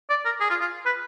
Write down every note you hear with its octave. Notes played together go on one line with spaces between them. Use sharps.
D5
A#4
G#4
F4
F4
B4